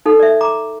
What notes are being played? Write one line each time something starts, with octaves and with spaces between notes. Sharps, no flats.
D#4 A4
D5 E5
A#5 D6